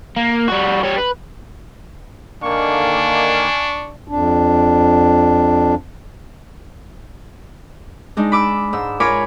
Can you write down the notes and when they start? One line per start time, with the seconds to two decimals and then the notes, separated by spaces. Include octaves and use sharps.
0.17 A#3
0.48 G3 F#4
0.83 G3 C#5
0.98 B4
2.43 D3 D#3 A#3 D4 F5 G#5 C#6
4.08 F2 D4
8.17 G#3 D4 D#4
8.32 B5 D6 E6
8.73 G#2 E6
9.00 F4 A#4 C#5 G#5 B5 D6